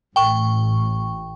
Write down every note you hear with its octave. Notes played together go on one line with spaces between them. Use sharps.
A1 A2 G5 C#6